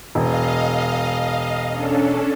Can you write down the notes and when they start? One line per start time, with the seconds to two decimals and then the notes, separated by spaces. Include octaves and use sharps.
0.15 E1 D#5 F5
1.70 C#4 D4 A4